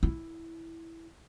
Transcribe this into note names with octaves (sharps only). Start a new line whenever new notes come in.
E4